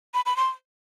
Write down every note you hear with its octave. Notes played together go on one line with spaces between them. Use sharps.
B5
B5
C6